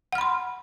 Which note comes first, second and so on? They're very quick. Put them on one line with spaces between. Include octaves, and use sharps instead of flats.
F#5 F6 B5 C6